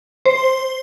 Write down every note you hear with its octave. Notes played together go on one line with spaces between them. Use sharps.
C5